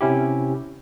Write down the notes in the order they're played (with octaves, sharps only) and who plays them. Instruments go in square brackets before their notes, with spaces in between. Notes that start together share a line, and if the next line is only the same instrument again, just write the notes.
[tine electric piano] C3 C#4 E4 G4